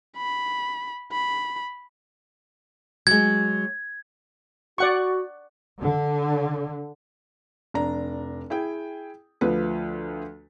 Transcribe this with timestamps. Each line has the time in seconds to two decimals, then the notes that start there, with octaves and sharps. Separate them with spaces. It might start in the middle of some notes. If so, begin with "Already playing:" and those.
0.17 B5
1.12 B5
3.07 F#3 G#3 G#6
4.78 F#4 D5 F#5 C#6
5.80 D3
7.74 F1 D4 A#5
8.50 E4 G#4 G5
9.41 D2 F3 B4